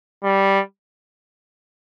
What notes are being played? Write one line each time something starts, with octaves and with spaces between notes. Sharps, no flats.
G3